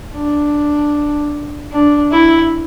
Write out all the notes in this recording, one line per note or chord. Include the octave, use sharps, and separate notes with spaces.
D4
D4
E4